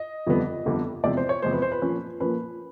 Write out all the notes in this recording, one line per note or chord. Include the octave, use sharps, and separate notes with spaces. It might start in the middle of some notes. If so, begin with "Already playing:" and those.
Already playing: D#5
G1 F2 D3 G3 B3
G1 F2 D3 G3 B3
E2 C3 F3 G#3 D5
C5
C#5
E2 C3 F3 G#3 C5
B4
C5
B4
A#2 F3 A#3 C#4
A#2 F3 A#3 C#4 B4